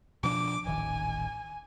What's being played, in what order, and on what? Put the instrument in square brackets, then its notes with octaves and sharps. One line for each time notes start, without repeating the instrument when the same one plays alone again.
[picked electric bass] B2 F3 D4 [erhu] D6
[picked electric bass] D#1 A1 D#3 [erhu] G#5